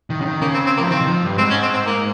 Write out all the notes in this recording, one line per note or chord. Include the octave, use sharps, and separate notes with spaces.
D#3
C#3
D#3
C#3 A#3
C4
C4
F3 A#3
D#3 C4
D#3
F3
G2
G#2 C4
C#4
C4
C4
A#3